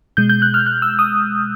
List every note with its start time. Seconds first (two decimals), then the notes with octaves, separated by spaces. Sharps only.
0.17 B2 G#3 G6
0.29 G6
0.42 F#6
0.54 F6
0.66 F#6
0.82 E6
0.99 D#6